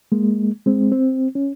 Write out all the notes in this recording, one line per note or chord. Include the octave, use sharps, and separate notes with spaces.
G#3 A#3
G#3 C4
C4
C#4